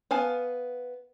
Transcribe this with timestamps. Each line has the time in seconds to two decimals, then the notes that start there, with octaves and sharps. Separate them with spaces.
0.11 B3 F5 G#5 A5